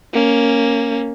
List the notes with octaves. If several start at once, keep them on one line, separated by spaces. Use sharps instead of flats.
A#3 C#4